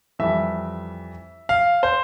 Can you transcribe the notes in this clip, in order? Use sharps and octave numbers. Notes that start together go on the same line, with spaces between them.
F2 E3 G3 E5
F5
C5